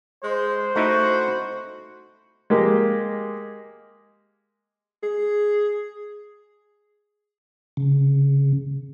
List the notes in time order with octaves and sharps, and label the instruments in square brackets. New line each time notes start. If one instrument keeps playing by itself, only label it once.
[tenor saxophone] G#3 [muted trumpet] C5
[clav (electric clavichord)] A3 D#4 E4 [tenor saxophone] F#4
[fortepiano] G#3 A#3 G4
[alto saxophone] G#4
[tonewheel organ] C#3